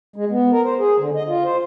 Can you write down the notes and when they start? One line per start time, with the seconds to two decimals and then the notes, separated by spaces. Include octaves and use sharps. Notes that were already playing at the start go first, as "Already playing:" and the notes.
0.16 G#3
0.30 B3
0.52 A#4
0.64 C5
0.79 G#4
0.99 D3
1.15 D#5
1.28 F4
1.44 C5